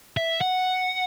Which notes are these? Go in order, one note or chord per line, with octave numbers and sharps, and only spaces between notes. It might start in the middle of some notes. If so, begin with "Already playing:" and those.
E5
F#5